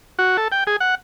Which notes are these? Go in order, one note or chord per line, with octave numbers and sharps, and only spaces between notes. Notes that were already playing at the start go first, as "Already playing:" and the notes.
F#4
A4
G5
G#4
F#5